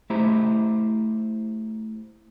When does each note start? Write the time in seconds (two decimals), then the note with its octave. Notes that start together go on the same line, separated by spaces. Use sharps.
0.10 A3 E4 G4 C5 A#5